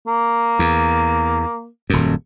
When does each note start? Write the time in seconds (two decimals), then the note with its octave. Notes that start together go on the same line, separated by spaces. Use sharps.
0.08 A#3
0.59 E2
1.90 D#1 F#2